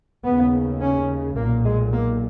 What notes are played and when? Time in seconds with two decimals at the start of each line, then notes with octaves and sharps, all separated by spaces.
0.24 D#2 C#3 B3
0.80 C#4
1.36 B1 A#2 A#3
1.64 G#3
1.93 A#3